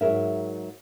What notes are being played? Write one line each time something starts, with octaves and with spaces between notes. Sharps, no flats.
G#2 F#3 G#4 A#4 E5